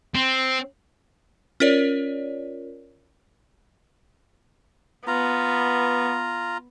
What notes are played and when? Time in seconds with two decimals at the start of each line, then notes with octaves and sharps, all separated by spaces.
0.15 C4
1.60 C#4 F4 A#4 C#5 D5
5.07 B3 F4 A#5